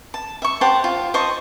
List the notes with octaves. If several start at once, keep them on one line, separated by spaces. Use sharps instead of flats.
A5
E5 C#6
G4 C5 F#5 A5
F4
C5 D#5 A5 C#6